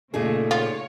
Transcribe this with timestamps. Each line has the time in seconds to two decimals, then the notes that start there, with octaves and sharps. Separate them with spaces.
0.14 A#2 C#3 A3 C#4 D#4 G#4 A4
0.51 F4 C#5